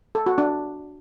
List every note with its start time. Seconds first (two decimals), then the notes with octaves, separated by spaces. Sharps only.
0.15 A4
0.26 F#4
0.38 D4